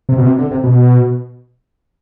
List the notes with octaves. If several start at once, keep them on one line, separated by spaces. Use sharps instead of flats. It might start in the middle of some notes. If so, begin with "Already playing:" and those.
C3
B2
C3
D3
C3
B2